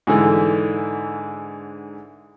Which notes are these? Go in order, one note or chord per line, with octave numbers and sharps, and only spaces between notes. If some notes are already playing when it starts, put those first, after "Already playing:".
G#2 D3 E3